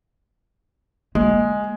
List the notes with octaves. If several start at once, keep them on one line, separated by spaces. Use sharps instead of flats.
G#3 A#3